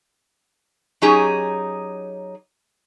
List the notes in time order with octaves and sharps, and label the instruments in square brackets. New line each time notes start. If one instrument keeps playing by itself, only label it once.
[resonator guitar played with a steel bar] F#3 C#4 D#4 G4 G#4